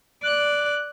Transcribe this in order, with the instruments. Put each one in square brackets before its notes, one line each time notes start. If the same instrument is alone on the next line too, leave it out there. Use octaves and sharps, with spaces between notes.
[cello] D5 [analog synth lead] F#6